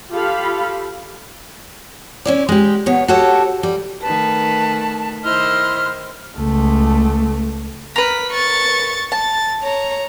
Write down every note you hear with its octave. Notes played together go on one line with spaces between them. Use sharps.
F4 G4 A4 F5 B5
C#4 E4 D5
G#3 G4
B2 B3 C#5
F#4 G4 A4 C#5
G3
D#3 A3 B4 A5
D#3 E4 C5 D#5 C6 F6
C#2 A3
A#4 B4 B6
C#6 A6
A5 A6
C#5 A#5